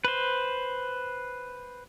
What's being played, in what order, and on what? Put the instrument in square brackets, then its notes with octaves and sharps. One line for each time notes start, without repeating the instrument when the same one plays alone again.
[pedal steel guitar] B4 C5